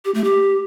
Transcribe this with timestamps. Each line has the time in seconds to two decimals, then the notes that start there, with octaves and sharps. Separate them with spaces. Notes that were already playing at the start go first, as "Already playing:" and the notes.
0.05 G4
0.14 A3
0.24 G4